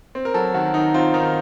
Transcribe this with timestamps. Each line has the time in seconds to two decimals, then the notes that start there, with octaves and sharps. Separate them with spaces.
0.15 C4
0.25 A#4
0.34 F#3 A4
0.54 D#3 F#4
0.74 D#3 D#4
0.94 C4 F4
1.14 D#3 D#4